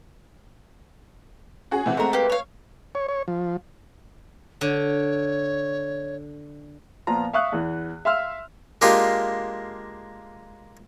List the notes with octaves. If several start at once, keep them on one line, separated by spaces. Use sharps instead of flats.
C#4 F#4 G#4
C3 E3 F#5
G#3 A3 C4 F#4 A#4
A#3 G4 B4
C#5 F5
C#5
C#5
F3
D3 C#5
A#2 F3 B3 F4 A#5
E5 F5 C#6 D#6 F#6
E2 E3
E5 F5 C6 E6 F6
G#3 A#3 D4 F4 G4